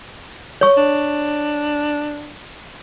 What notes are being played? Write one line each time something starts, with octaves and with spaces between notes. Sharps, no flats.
C#5 C#6
D4